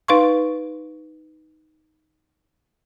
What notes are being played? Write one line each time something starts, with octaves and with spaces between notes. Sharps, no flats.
D#4 B4 F5 C6 C#6